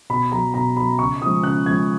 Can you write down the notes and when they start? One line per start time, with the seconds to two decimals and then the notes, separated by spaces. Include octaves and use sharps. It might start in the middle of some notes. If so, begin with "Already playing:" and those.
0.09 B2 B5
0.32 F#3 A#5
0.54 B2 A#5
0.77 F#3 B5
0.99 C#3 C#6
1.22 F3 G#3 D#6
1.43 C#3 F#6
1.66 F3 G#3 G#6